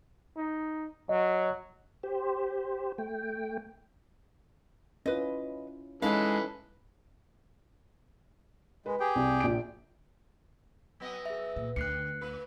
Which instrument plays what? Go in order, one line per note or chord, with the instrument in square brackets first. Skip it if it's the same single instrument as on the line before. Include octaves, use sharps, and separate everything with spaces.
[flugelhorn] D#4
[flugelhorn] F#3 [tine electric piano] D#5
[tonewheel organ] G4 C5
A3 G5
[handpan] C#4 E4 F4 [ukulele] B4 D#5
[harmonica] E3 A4 B4 [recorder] G#3 [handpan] C#4 D#4 [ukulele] F5
[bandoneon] G#3 [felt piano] B4
[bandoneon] G4 G#4 G5
[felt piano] C2
A#1 D7
[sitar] F#3 B3 D#5
[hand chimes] G#4 E5
[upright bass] A#2
[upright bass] D2 [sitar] D3 [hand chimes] F#6 C7 C#7
[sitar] A2 B4